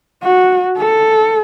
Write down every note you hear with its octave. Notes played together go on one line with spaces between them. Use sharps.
F#4
A4